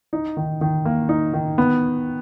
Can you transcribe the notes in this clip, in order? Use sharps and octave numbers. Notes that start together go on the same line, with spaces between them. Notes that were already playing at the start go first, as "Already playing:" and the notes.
D#4
D#3
D#3
A#3
D#4
D#3
B3